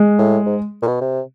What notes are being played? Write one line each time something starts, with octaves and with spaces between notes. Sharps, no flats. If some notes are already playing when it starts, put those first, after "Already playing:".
Already playing: G#3
A2
G#2
A#2
B2
C3